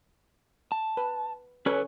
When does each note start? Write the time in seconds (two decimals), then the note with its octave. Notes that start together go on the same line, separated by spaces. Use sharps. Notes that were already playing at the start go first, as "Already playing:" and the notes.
0.72 A5
0.97 B4
1.66 C#4 A4 B4 C#5